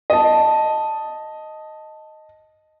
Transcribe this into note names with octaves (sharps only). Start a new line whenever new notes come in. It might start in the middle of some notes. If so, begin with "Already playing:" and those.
D#5 A5